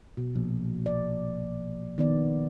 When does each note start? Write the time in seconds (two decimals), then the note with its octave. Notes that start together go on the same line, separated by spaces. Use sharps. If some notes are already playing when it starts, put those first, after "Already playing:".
0.17 B2
0.35 A#1
0.86 D5
1.98 D#3 B3 D5